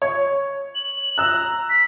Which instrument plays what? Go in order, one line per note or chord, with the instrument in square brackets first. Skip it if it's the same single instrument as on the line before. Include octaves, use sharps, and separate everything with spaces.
[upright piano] C#5
[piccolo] F#7
[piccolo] A#5 [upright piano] E6 F#6
[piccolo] B6